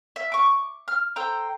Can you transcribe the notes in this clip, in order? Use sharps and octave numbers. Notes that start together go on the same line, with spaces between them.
E5
C#6 D6
F6
A4 C5 G5 A#5